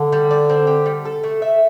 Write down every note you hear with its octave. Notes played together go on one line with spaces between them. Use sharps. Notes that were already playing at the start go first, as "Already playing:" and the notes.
Already playing: D3
G3
D5
C4
G4
G3
A4
A3
E5